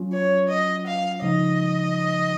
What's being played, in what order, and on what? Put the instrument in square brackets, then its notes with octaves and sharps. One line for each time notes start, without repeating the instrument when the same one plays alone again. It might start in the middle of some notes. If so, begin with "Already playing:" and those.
Already playing: [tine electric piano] F#3 C#4 F4
[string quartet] C#5
D#5
F5
[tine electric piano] C#3 F3 G#3 D#4 [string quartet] D#5